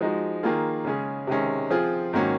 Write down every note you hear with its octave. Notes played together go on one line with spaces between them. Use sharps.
F3 G#3 D#4 F#4
D#3 A#3 F4 G#4
C#3 G#3 C#4 G#4
C3 D#3 G#3 C#4
F3 C4 F4 G#4
G#2 D#3 A#3 C#4 F#4